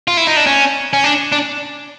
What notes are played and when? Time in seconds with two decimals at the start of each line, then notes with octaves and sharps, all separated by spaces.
0.08 F4
0.17 E4
0.27 D#4
0.37 D4
0.47 C#4
0.93 C#4
1.04 D4
1.32 D4